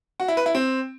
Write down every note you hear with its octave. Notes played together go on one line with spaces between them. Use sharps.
F#4
E4
B4
E4
C4